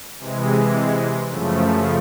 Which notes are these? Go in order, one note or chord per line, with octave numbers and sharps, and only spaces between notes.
C3 E3 G#3
F#2 C#3 F3 A3